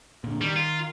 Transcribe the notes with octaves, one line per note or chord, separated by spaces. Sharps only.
A#2 D3
D#3 G3
F4